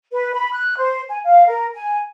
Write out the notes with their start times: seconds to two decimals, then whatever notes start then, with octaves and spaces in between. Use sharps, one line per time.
0.12 B4
0.34 B5
0.53 F#6
0.78 C5
1.10 G#5
1.25 F5
1.47 A#4
1.75 G#5